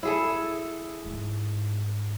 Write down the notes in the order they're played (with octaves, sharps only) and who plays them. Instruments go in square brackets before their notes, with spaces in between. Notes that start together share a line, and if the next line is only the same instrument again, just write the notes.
[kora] E4 G#4 A4
[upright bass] G#2